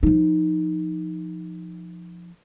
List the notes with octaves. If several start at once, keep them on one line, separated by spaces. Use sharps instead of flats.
F3 D#4